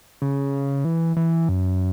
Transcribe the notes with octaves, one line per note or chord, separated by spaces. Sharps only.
C#3
E3
E3
F#2